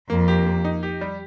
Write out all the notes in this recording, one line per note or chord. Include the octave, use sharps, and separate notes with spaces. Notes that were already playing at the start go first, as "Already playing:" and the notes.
F2 A#3
G4
A#3
D#4
G4
G3